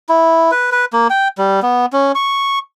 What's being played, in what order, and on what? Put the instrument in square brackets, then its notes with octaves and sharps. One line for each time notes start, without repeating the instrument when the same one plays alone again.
[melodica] E4
B4
B4
A#3
G5
G3
B3
C#4
C#6